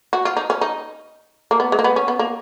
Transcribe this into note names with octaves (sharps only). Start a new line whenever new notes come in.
F#4
F4
D#4
C#4
D#4
A#3
B3
G#3
A#3
B3
C#4
B3
A#3